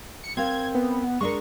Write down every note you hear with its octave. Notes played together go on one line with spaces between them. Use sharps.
C#7
C4 A#4 F5 G#6
B3
G#3 D4 A#4 C#6